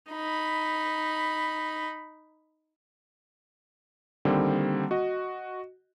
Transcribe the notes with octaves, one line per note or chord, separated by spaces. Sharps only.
D#4 B5
D3 D#3 G3 A#3 C4
F#4 D#5